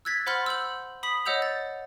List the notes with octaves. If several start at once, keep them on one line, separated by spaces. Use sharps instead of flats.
E6 F#6 G#6 A6 B6
C5 F#5 B5 C6 F6 A6
E6 G6 F#7
B5 D#6 B6 F#7
C#5 D#5 F#5 E6 G6 F7
A6